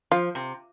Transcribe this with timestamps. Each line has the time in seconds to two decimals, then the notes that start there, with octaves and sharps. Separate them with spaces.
0.11 F3 F4
0.35 C3